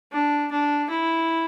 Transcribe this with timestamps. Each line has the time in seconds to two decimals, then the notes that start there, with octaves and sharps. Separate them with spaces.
0.12 D4
0.51 D4
0.89 E4